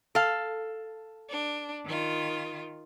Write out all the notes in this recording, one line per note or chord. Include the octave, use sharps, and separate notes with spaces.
A4 F5
D4
D#3 F4